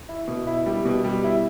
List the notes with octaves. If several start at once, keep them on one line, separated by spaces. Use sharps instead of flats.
E4
B2
E4
G3
B2
G3
E4